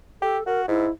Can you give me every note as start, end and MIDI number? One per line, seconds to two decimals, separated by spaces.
0.22 0.38 67
0.22 0.44 69
0.46 0.68 66
0.46 0.61 70
0.68 0.87 44
0.68 0.91 64